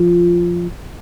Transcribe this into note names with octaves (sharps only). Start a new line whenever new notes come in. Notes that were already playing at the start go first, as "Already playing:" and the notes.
Already playing: F3